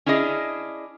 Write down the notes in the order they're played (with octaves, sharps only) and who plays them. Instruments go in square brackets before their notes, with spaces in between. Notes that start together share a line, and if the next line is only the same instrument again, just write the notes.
[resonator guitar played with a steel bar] C#4 D4 E4 G#4 D#5